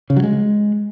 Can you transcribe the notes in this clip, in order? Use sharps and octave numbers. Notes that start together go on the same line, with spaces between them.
C#3
F#3
G#3